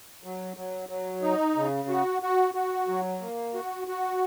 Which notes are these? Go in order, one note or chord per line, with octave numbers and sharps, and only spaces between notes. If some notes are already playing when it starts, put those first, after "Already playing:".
F#3
F#3
F#3
D#4
C#3
F#4
F#4
F#4
F#3
A#3
F#4
F#4